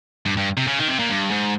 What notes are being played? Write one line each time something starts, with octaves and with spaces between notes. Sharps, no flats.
G2
G2
C3
C#3
D#3
C3
A#2
G2
G#2